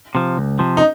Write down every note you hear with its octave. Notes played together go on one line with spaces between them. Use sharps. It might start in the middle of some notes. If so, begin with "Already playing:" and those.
C3 F3
C#2
C3 F3
D#4